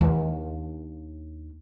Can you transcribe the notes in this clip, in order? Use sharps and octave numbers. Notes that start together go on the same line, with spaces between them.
D#2 D4